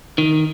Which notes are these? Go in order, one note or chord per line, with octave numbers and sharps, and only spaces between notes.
D#3